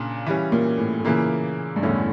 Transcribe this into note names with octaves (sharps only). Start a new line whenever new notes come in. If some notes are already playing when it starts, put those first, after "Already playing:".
Already playing: A#2 C#3 D4
E3 G3 C#4
A#2
A2
A2
A#2 C#3 E3 A#3 E4
G2
E2 A2 D3 A3 C#4 E4